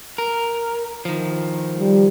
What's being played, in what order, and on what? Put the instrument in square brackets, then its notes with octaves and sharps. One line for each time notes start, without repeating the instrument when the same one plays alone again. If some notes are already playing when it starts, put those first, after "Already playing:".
[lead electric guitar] A#4
D#3 F3
[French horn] G3